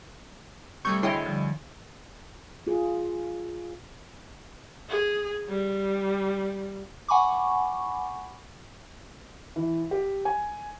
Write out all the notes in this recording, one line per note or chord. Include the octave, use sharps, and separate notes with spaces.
C3 G3 A3 C#6 E6 G6 G#6
D2 E4 G#4 C#5 D#5 G5 C6
D3 F3 G3
F4 G#4
G#4
G3
F#5 G#5 B5 C#6 D6
E3
G4
G#5